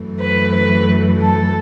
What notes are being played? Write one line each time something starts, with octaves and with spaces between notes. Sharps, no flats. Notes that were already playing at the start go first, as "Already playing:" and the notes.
Already playing: F#2 E3 A3
B4
B4
A4